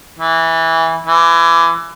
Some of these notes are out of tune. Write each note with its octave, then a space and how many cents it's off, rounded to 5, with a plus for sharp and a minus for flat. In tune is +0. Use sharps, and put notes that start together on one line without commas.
E3 -10
E3 +25